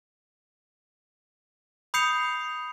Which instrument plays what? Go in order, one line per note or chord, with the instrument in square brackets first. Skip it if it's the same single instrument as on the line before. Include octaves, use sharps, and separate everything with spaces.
[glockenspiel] B5 D#6 G6 C7 C#7 F7